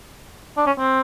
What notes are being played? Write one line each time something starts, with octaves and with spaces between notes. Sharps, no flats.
D4
C#4
C4